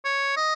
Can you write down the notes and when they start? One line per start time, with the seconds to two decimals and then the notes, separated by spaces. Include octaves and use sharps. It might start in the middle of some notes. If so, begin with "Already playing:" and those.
0.05 C#5
0.37 D#5